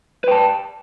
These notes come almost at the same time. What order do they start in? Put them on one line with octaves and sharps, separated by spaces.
B4 G5 A5